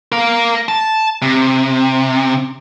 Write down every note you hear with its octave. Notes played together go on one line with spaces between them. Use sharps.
A#4 F5
A5
C3